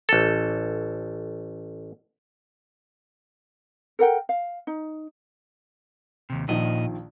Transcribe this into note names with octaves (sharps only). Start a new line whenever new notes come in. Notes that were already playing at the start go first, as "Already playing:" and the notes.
A1 A4
A4 A#4 F#5 G5
F5
D#4
D#2 C3
A#1 A#2 D#3 F3 D#5